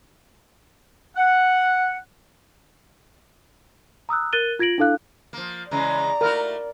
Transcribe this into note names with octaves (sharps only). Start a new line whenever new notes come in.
F#5
A#5 D#6 E6 F#6
A#4 F#6 A6 D#7 G7
F4 G#6 A#6 D7 F#7
D4 E4 A4 F5 F#6
F3 A#3
C#3 E3 G#3 D5 A#5
A3 E4 F#4 A#4